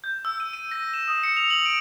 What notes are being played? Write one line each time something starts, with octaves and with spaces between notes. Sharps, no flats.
G6
E6
D#7
D#7
A#6
E7
D#6
C#7
F7
F#7
D7